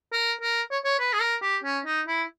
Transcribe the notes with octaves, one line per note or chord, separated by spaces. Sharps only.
A#4
A#4
C#5
C#5
B4
G#4
A#4
G4
C#4
D#4
E4